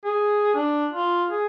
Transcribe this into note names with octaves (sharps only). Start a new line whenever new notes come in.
G#4
D4
F4
G#4